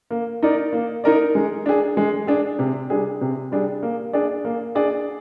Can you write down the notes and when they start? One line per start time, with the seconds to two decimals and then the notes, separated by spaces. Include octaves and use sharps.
0.11 A#3
0.43 D#4 A#4 D5
0.73 A#3
1.04 D#4 A#4 D5
1.35 G#3
1.66 D4 G#4
1.97 G#3
2.27 D4 G#4
2.59 C3
2.90 G3 D4 G#4
3.21 C3
3.52 G3 D4 G#4
3.83 A#3
4.13 D4 G#4 D5
4.45 A#3
4.75 D4 G#4 D5